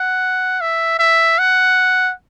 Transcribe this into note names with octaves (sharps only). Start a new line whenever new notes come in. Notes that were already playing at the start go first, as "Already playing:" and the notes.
Already playing: F#5
E5
E5
F#5